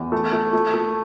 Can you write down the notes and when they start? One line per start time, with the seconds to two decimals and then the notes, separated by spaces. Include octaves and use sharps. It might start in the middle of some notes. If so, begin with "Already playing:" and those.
Already playing: E2
0.12 A3
0.32 A3
0.53 A3
0.74 A3